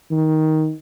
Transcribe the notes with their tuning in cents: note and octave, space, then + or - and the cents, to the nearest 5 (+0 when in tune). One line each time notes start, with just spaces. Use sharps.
D#3 +10